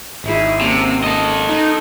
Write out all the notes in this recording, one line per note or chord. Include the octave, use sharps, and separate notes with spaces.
G#1 D#4 E4 G#4
C3 A#3 C#4
A4 D#5
D#4